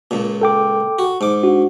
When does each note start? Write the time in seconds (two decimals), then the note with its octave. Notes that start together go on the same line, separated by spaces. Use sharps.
0.11 C#2 A#2
0.41 A4 G5 D6
0.99 F#4
1.21 G#2 D6
1.43 D4 F#4